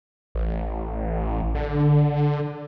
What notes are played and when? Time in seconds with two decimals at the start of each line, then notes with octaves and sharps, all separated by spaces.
0.35 A1
1.55 D3